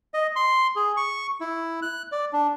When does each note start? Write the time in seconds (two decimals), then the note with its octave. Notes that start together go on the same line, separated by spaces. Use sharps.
0.14 D#5
0.36 C6
0.76 G#4
0.97 C#6
1.41 E4
1.82 F#6
2.12 D5
2.33 D4